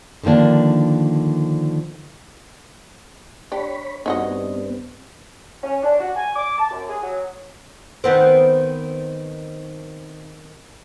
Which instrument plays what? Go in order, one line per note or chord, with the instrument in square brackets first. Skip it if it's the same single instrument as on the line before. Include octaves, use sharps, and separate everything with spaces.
[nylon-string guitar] D3 D#3 F3 A#3 D4
[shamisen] D4 G4 [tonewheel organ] C#5 B5
[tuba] G2 [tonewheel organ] B3 C4 [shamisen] D#4 F#4 D#5
[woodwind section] C#4
D4
F#4
G#5
D6
A5
F#2
G#4
F#3
[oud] D#3 B3 C4